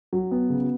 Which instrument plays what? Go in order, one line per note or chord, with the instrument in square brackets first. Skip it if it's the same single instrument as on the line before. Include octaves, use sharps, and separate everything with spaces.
[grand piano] F#3
B3
C#3